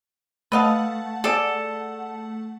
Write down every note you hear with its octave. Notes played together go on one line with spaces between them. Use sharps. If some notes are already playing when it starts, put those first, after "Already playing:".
A3 B4 D#5 F5 F#5 A5
G#4 A4 D5